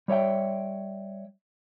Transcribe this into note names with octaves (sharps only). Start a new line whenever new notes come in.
G3 C#5 E5 G5